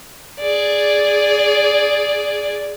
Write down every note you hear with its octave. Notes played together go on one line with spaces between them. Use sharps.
G#4 D5